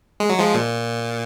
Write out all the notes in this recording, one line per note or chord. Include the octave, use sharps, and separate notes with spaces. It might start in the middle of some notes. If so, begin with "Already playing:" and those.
G#3
F#3
F3 G#3
A#2